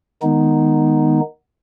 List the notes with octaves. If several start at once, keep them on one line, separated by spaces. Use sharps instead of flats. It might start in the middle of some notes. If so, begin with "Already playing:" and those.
D#3 G#3 B3 D#4